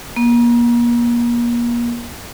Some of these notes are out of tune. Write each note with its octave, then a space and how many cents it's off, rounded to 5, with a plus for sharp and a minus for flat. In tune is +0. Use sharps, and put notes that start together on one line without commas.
A#3 +35